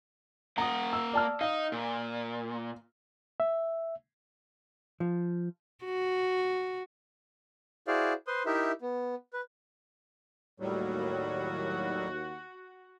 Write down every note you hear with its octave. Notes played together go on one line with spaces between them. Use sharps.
A#3 F#5 A#5 D#6
E6
D5 A5 F6
D#4 F5
A#2
E5
F3
F#4
E4 F#4 G#4 C5 D5 F5
B4 C5 C6 D#6
D#4 E4 G4 A#4 E5
B3
B4
D#2 A2 F#3 G3 F#4